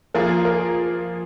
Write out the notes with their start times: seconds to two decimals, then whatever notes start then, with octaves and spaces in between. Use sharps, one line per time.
0.14 F3 A#3 F4 G#4 A#4
0.45 A#4